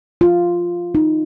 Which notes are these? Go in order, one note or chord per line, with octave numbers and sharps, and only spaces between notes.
F4
D#4